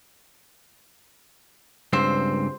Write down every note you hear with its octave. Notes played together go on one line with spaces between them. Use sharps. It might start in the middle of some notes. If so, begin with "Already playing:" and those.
C#2 G2 C4 C5